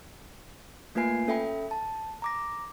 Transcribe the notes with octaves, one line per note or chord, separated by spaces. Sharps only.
A3 A#3 F4 B4 G#5 C7
C#4 A4 E5 G5 B5
A5
A#5 D6 A#6